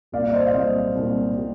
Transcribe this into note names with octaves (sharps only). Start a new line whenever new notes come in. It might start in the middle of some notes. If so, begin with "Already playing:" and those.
C2 A#2 G3 D5 F5
D5
C5 D#5
F5
C2 A#2 G3 C5 D#5
C2 A#2 G3
A#2 G3